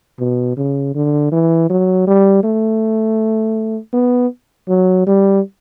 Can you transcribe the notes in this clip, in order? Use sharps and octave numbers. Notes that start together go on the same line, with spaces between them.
B2
C#3
D3
E3
F#3
G3
A3
B3
F#3
G3